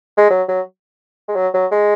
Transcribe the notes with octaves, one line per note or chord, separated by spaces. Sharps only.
G#3
F#3
F#3
G#3
F#3
F#3
G#3